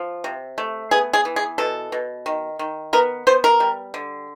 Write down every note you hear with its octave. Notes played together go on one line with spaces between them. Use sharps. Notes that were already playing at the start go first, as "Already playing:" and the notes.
Already playing: F3
C3
A3
B3 G#4
G#4
E3
G#4
B2 A4
B2
D#3
D#3
B3 A#4
B3 C5
A#4
G3
D3